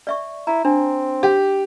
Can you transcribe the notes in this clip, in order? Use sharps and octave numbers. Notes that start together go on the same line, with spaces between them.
D5 E5 C#6
E4 A#5
C4 D4
G4